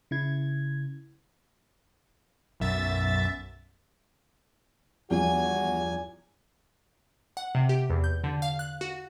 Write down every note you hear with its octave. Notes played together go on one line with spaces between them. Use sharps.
C#3 E4 G#6
B1 F#2 E5 A6
E2 G2 F3 F#4 G#5
F#5
C3
G4
E2
G6
D3
F5
F#6
F#4